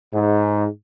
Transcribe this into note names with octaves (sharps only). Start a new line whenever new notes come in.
G#2